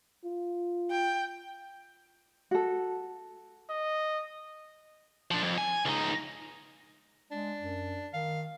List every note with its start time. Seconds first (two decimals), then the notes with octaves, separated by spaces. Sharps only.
0.24 F4
0.91 G5
2.51 F#4 A4
3.70 D#5
5.31 F3 D4
5.42 F2
5.58 G#5
5.85 C#2 D#4
7.31 G#3 D4
7.61 F#2
8.14 D#3 F5